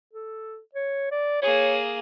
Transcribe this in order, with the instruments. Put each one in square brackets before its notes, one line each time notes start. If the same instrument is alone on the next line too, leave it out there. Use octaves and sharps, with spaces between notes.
[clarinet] A4
C#5
D5
[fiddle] A#3 G#4 [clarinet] C#5